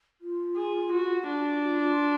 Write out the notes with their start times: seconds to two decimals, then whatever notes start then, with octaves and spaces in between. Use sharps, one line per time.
0.21 F4
0.56 G#4
0.92 F#4
1.28 D4
1.64 F#4
1.68 F4